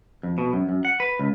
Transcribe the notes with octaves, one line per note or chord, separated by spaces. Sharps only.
F2
B2
F#2
F#2
F#5
B4
C#2